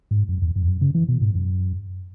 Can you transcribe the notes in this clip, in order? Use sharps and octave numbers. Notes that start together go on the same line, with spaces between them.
G#2
F#2
E2
F#2
E2
F#2
C#3
E3
B2
G#2
F#2